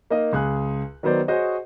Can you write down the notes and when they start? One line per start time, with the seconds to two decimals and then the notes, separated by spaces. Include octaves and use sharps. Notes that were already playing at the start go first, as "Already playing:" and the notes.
0.10 A#3 D#4 D#5 F5
0.33 C#2 G#4 F#6
1.03 D#3 F#3 B3 C5 D5
1.28 F#4 G#4 C5 C#5 D#5